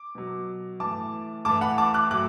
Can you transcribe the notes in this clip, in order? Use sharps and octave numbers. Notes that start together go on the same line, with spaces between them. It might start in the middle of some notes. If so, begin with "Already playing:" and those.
Already playing: D6
B2 F#3
A2 E3 A5 D6
A2 E3 A5 D6
F#5 B5
A5 D6
D6 F#6
A2 F#3 D6 F#6